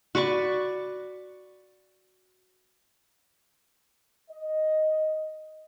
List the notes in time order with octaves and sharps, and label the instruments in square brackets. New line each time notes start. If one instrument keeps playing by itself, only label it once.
[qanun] F#4 B4 D5 C#6
[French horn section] D#5